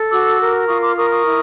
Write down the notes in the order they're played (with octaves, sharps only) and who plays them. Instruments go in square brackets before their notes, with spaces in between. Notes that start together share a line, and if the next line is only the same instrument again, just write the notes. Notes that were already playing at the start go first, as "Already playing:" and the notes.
Already playing: [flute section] A4
F#4 D6 E6
A#4
F4 C#6 D#6
C6 D6
A#4 C#6 D#6
C#6 D#6
E4